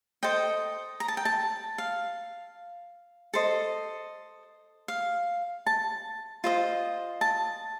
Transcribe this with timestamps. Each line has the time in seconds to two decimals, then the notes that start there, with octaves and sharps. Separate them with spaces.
0.23 A4 C5 D#5 G5
1.00 A#5
1.08 A5
1.17 G5
1.25 A5
1.78 F5
3.34 A4 C5 D#5
4.88 F5
5.66 A5
6.44 F4 C5 D#5
7.21 A5